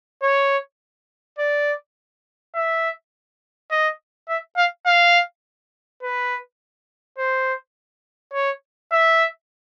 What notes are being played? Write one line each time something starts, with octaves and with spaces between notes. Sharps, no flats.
C#5
D5
E5
D#5
E5
F5
F5
B4
C5
C#5
E5